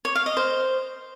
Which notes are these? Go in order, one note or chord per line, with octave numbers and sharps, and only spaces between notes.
C#5
F5
D#5
C5